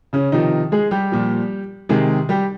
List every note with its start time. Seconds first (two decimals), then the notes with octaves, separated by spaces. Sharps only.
0.13 C#3 C#4
0.32 C3 D#3 F3 D#4
0.72 G#3 G#4
0.91 G3 G4
1.12 A#2 F3
1.89 C3 D#3 G#3 G#4
2.29 G3 G4